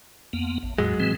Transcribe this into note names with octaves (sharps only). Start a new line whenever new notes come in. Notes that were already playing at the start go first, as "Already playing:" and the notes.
F2 A#3 B3
A1
E2 A2 F#3 G#3
A2 E3 C4